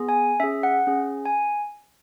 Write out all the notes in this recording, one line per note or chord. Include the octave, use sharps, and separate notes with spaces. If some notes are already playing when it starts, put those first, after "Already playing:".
Already playing: B3 G#4
G#5
C#4 G#4 E5
F#5
C#4 G#4
G#5